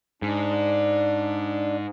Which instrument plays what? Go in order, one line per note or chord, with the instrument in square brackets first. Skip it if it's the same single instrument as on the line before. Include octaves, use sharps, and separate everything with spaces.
[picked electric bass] G#2 [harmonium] D4